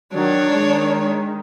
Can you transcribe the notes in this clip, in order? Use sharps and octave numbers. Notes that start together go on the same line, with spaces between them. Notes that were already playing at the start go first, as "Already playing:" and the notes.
D#3 F#3 D4 C#5
D#3 G#3